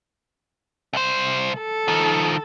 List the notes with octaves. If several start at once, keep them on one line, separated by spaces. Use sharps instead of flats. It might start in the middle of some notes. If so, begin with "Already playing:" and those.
C2 C5
A4
D#3 F3